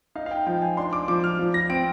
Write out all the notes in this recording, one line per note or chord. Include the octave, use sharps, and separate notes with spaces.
D#4 F5
F5
G5
F3 G5
G#5
D4 C6
D6
F3 D6
F6
F3
A#6
C4 D7